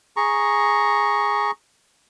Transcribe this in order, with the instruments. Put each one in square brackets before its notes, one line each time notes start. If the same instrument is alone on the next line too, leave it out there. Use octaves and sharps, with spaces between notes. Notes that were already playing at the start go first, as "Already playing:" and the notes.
[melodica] G#4 A#5 C#6